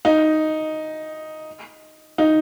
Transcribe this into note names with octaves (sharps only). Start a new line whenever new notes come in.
D#4
D#4